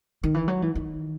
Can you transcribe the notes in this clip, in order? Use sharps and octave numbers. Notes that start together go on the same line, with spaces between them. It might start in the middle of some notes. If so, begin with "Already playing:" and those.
D#3
E3
F#3
E3
D#3